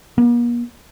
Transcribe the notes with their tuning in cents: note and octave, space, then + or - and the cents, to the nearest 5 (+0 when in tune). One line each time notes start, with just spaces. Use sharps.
A#3 +45